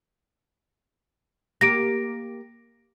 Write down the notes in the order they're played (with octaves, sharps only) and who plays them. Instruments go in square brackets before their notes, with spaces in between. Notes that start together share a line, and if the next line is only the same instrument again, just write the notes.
[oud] A#3 G4 [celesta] A#6 D7